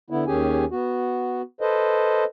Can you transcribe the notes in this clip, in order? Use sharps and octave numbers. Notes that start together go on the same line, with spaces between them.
D3 B3 E4
D#2 D#3 C#4 G4 G#4 G#5
B3 F#4
A4 B4 C5 D#5